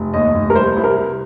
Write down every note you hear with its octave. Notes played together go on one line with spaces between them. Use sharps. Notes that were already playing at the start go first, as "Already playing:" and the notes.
Already playing: F1
D#2 D#5
F1
A#4
G3 C5
C2
A#4
C3